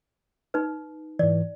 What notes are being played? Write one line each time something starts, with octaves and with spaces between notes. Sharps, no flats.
D#4 B4
G#2 E3 D5